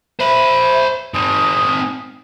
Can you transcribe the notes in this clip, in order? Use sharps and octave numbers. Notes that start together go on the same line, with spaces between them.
C5 E5 B5
C4 D#4 D#6